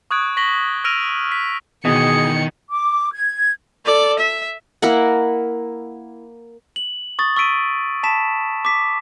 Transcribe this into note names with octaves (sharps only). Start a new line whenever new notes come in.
C#6 D#6 F#6 G#6 D7
C#6 A#6 B6 F#7 G7
E6 F6 A#6 D7 D#7 F7
B6
B2 D#3 E3 G#4 C#7
D6
G#6
A4 D5
E5
A#3 E4 A#4 F#5
F#7
C#6 D#6 A6
C#6 E6 B6 D7 D#7
A5 B5 B6 E7
D6 B6